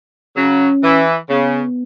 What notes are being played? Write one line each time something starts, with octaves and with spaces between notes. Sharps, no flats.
C#3 F#3 C#4
E3
C#3 B3